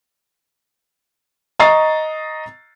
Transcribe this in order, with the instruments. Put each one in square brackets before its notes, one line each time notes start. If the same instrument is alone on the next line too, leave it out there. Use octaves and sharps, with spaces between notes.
[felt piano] D#5 A#5 C#6 D#6 A6 C7